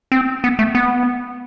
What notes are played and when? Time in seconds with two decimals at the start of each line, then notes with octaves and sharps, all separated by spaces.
0.12 C4
0.44 B3
0.59 A3
0.75 B3